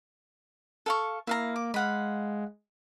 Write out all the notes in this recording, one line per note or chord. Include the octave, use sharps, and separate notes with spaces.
A4 F5 C#6
A#3 E4 F5 A#5
D6
G#3 F5 F#5 B5